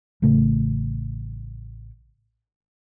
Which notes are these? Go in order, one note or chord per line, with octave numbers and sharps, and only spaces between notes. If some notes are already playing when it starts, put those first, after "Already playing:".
A1 C#3 A3